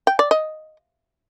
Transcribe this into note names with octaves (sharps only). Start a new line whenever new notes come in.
G5
D5
D#5